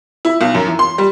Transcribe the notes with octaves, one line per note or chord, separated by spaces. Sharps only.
E4
B1
F#2
E3
C6
G3